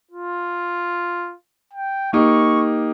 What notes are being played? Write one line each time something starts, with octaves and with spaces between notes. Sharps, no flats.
F4
G5
A#3 D#4 G4 C#6